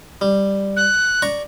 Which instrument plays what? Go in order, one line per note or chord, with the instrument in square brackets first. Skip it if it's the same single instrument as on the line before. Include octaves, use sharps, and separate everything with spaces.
[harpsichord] G3
[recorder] F#6
[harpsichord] D5 A#5 C#6